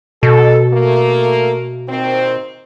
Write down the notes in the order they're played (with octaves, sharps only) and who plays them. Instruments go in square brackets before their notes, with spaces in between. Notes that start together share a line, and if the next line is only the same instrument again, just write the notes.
[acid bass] B2 [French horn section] A4
[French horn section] A3 A#3
A#2 D#3 C4